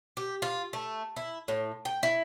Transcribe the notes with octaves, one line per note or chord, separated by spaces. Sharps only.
G4
F4
A3
E4
A2
G5
E4